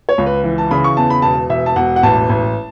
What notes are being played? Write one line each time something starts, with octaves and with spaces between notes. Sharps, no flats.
C#5
C#2
B4
E3
A5
C#3 B5
C#6
E2 A5
B5
E1 A5
E1 E5
A5
E1 F#5
F#5
A1 A5
A1